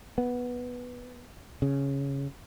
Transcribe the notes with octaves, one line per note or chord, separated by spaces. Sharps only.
B3
C#3